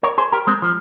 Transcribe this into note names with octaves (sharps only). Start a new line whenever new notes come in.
A#4 C#5
G#4 C5
G4 A#4
G#3 C4
F3